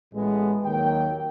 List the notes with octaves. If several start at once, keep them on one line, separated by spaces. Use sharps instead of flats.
A1 A2 E3 G#3 B3
D#2 D#3 F#3 A#3 G5